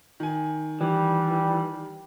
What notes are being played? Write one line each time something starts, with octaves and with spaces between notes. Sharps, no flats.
D#3 G#5
E3 G3